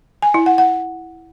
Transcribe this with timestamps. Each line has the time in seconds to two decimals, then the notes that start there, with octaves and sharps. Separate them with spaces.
0.22 G#5
0.34 E4
0.46 F#5
0.58 F#5